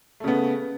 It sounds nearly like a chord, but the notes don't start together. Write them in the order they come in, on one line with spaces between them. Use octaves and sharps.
A3 C#3 B3